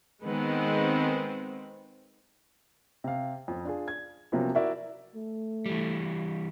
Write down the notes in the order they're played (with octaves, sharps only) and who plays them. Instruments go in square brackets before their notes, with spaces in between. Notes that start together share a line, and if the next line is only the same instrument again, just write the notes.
[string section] D#3 G#3 B3 C4
[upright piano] C3 F5
F2 F3
D4 F4 G#4
G#6
C3 F3 F#3 A#3 B3 C#4
E4 F#4 A#4 D5 E5
[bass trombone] A3
[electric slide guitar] E3 G3